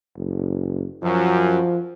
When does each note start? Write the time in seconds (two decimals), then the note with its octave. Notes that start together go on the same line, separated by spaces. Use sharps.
0.17 F#1
1.03 F#2 F3